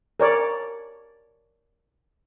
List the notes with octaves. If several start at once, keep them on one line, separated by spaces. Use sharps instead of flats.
A#4 C#5 D5